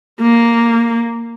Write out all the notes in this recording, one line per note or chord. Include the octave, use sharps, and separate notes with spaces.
A#3